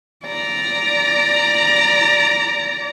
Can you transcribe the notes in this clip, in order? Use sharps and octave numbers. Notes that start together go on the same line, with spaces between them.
D5 A#5